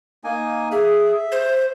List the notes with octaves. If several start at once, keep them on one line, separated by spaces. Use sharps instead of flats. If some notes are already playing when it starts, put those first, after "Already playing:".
A#3 D#4 G#5
G#4 E5
C5